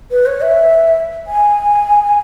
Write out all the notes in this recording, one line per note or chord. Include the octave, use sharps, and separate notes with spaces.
B4
C#5
E5
G#5